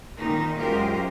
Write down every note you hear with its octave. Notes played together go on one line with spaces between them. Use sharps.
A#2 D#3 D#4
F#2 G#3 F4 G4 A#4 C5